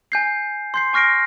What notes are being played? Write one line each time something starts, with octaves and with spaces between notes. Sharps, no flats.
G#5 G6 C7
C6 G6 C7
G#5 C#6 F6 A#6 C7 D7